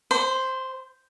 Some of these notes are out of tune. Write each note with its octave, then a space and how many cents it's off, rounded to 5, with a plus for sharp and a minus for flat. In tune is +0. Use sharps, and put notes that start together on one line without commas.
C5 +0 C6 -45